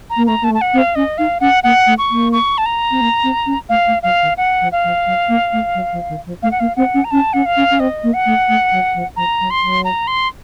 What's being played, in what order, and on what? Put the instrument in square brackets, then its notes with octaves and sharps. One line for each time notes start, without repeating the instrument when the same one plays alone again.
[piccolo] A#5
[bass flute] A#3
[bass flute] A3 [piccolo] A#5
[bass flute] A#3 [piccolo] A5
[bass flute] A3
[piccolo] A5
F#5
[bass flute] C4
[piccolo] F5
[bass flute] C#4 [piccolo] D#5
[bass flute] D#4 [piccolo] F5
[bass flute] C#4 [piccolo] F#5
[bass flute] A#3 [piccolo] F#5
[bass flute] A3
[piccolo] C#6
[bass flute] A#3
[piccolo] C#6
A5
A#5
[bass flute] C4
A#3
C4
C#4
[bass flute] A3 [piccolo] F5
[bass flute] A3
[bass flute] F#3 [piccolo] F5
[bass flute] D#3
[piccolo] F#5
[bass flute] F3
[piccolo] F5
[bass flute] F3
F#3
A#3
A3
F#3
F3
D#3
F3
[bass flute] A3 [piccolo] F5
[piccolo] F#5
[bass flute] A#3 [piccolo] F5
[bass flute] C4 [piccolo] F#5
[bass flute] C#4
[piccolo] A#5
[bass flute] C#4 [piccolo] A5
[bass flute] C#4 [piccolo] F#5
[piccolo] F5
[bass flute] C#4
C#4
[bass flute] C4 [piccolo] D#5
[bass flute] A#3
[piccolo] F#5
[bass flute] A3
A3
F#3
F3
[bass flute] F3 [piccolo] A#5
[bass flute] F#3
[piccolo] C6
[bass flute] F#3
[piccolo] A#5
C6